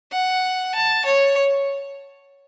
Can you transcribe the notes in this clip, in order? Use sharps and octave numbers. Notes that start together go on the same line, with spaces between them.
F#5
A5
C#5